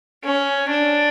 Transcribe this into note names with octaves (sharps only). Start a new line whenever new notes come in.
C#4
D4